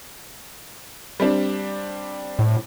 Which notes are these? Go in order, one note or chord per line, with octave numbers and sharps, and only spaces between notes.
G3 C4 D4
A2